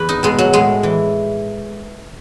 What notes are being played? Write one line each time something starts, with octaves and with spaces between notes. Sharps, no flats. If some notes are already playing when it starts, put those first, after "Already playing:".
Already playing: E2 B4
D#4
B2 G#3
F#3
A2 G#3
E3